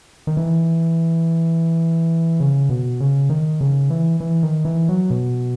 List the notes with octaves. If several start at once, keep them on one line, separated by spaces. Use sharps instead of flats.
D#3
E3
C#3
B2
C#3
D#3
C#3
E3
E3
D#3
E3
F#3
B2